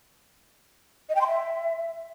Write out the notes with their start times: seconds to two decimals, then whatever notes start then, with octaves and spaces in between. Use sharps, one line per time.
1.09 D#5
1.15 G5
1.21 C6
1.27 E5